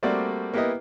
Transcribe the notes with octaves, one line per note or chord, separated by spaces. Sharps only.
G3 A3 A#3 C4 F#4 D5
A#3 B3 E4 G4 B4 D#5